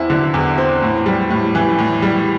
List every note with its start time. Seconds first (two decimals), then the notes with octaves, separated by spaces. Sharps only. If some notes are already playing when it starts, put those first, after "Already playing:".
Already playing: E2 C4 E4
0.10 D3
0.34 E2
0.58 C4
0.82 A2
1.06 G3
1.30 A2
1.55 E3
1.79 A2
2.02 G3